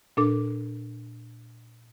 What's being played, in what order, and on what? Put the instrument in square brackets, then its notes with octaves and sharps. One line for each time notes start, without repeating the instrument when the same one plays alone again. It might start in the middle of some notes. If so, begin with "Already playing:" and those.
[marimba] A#2 D4 A4 D6